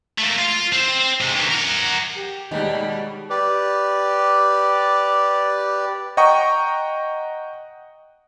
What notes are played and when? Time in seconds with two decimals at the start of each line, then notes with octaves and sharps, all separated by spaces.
0.18 A3 A#3
0.38 F4
0.73 C4
1.21 C3 G#3
1.35 D#3 E3
1.51 A#4 F#5
2.17 G4
2.51 D#2 B2 G3 G#3 D#4
3.30 G4 B4 D5
6.17 D#5 F#5 G5 A#5 C#6 D#6